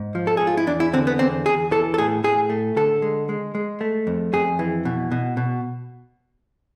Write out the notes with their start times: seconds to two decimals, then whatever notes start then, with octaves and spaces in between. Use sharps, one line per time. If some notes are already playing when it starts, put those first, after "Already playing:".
Already playing: G#2
0.15 F3
0.27 A4
0.37 G#2 G#4
0.47 F4
0.57 E4
0.67 E2 D4
0.80 E4
0.93 D3 C4
1.07 B3
1.19 E2 C4
1.46 E2 G#4
1.71 E3 A4
1.94 A4
1.98 A2 G#4
2.24 A2 G#4
2.50 A3
2.76 D3 A4
3.02 G#3
3.29 G#3
3.55 G#3
3.81 A3
4.07 F2
4.33 F2 G#4
4.59 E3
4.85 B2
5.11 B2
5.37 B2